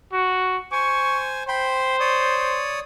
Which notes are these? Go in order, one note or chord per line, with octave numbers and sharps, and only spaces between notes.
F#4
C5 G#5 C#6
C5 G5 B5 C6
C#5 D5 D#6